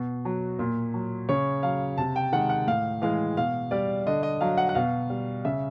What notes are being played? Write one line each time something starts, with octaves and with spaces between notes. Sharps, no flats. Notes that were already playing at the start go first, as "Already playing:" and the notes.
Already playing: B2
F#3
A#2
F#3
C#3 C#5
F#3 F5
C3 A5
G5
D#3 G#3 F#5
F#5
A2 F5
E3 G#3 F5
B2 F5
G3 D5
D3 D#5
D#5
F#3 F5
F#5
F#5
B2 F5
G3
C#3 E5